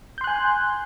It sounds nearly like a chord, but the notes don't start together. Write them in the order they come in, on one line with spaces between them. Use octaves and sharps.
G6 C6 F#6 G#5